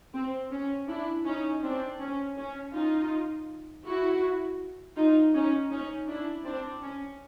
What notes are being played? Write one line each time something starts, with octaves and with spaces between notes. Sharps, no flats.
C4
C#4
D4 E4
C#4 D#4
C4 D4
C#4
C#4
D#4 F4
E4 F#4
D#4 F4
C#4 D#4
C#4 D#4
D4 E4
C4 D4
C#4